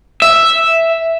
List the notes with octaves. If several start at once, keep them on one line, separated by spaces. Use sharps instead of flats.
E5